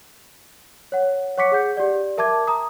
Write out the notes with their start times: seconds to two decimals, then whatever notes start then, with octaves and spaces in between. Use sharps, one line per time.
0.92 C#5 F#5
1.37 C#5 F#5 C#6 D6 B6 C#7
1.52 G#4 F#5 G6
1.77 G4 D5
2.18 A#4 E5 A5 D6 G#6
2.47 A#5 D#6